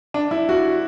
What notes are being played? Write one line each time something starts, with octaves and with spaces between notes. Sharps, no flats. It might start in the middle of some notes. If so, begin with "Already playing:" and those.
D4
E4
F#4